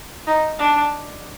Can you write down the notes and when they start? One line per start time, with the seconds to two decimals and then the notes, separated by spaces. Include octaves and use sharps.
0.27 D#4
0.59 D4